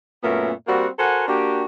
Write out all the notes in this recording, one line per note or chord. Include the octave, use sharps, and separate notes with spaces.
F#2 A#2 A3 B3 C#4 A#4
G3 A#3 C4 F#4
F#4 A4 A#4 C5 F#5 G#5
A#3 D4 F#4 G4